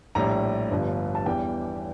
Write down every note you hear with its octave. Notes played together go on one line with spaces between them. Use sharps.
A#1 A2 G3 A#5
G1 G2 F3
A5
E2 E3 G3 G5